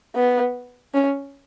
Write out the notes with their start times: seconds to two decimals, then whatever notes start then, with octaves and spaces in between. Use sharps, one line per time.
0.16 B3
0.94 C#4